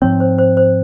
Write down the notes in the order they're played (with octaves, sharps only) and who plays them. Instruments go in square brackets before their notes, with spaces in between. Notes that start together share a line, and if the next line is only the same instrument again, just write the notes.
[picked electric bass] G#2 F3 C4 [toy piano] C#5
[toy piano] C5
C5
C5